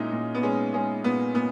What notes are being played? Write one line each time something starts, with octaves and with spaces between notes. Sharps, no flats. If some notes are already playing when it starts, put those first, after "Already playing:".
Already playing: A#2 G#3 C#4 D#4 E4
A#2
B3
G#3 C#4
G#3 C#4
A#2 B3
A#2 B3